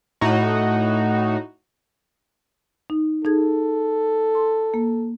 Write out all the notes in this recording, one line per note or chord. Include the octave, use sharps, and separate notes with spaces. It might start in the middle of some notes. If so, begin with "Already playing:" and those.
A2 D#4 F#4
D#4
D#4 G#4 A4 G#6
C6
A#3